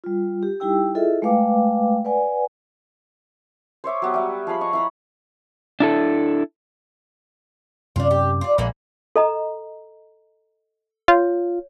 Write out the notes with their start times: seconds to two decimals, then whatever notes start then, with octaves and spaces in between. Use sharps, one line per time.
0.04 G3 F4
0.43 G4
0.60 G3 D#4 E4 G4 G5 E6
0.95 E4 F4 G#4 A4 D#5 E5
1.22 G#3 A3 B4 F5 G5 D6
2.05 B4 D5 F#5 G#5
3.84 C5 C#5 E5 D6
4.02 F#3 B3 G4
4.14 G3 E5
4.47 F3 G#4 F5 B5
4.61 D#5 C#6
4.73 E4 A#5 B5
5.80 D4 E4 A4
7.96 F#2 C3 C#4 D4 F4
8.11 G4
8.41 F4 D5
8.58 A#1 E3 G#3 A#3
9.16 A4 D#5 A#5
11.08 F4 C#5